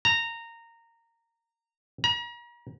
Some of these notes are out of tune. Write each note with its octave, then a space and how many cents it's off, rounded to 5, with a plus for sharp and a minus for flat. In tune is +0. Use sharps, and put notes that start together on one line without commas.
A#5 -15
A#5 +40